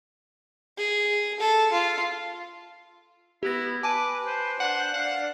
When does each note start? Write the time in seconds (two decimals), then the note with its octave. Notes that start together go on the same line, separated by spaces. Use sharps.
0.78 G#4
1.40 A4
1.72 F4
3.43 B3 E4 G4 A#6
3.83 B4 G#5 A5 D6 D#7
4.26 C5
4.60 D4 F#5
4.94 D4 F5 F#5